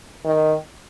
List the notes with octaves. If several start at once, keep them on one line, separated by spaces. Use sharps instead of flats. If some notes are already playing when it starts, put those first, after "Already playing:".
D#3